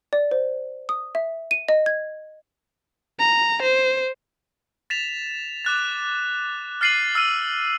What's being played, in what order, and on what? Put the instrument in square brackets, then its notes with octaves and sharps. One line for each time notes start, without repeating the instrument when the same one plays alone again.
[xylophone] D5
C5
D#6
E5
D#7
D#5
G#6
[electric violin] A#5
C5
[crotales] A6 B6 E7 F7
D6 F#6 A6
F6 A6 C7 D#7 F#7
E6 F6 A6 D#7